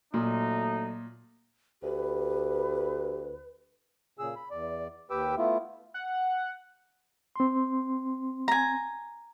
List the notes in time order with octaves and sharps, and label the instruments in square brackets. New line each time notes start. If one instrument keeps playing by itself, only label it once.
[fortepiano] A#2 [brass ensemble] F#3 A3 D#4
[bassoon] D2 [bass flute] G4 [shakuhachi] B4
[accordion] A#2 C#3 G#4 E6
B5
E2 D5
D#2 G4 B4 G5 D6 E6
A3 B3 E4 F4
[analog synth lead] F#5
[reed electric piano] C4 C6
[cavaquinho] G#5 A#5